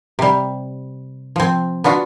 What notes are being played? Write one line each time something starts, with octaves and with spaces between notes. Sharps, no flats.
C3 G3
F3 C4
B3 D4 F4 F#4